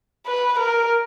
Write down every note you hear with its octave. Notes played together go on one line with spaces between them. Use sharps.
B4
A#4